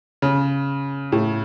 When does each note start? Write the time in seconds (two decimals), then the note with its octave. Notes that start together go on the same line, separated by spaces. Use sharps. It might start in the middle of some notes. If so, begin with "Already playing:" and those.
0.22 C#3
1.12 A2